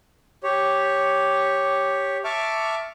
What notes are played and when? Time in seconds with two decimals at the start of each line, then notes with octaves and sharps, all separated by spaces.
0.43 G4 C#5
2.24 E5 A5 C#6 D6 F6